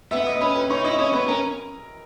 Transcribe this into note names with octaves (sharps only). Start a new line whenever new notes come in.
B3 E5 E6
D#5 D#6
C#4 B4 B5
B4 B5
D#4 C#5 C#6
E4 D#5 D#6
C#4 C#5 C#6
B3 B4 B5
C#4 A#4 A#5